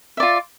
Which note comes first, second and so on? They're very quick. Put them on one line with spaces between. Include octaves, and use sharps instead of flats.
E5 D5 F4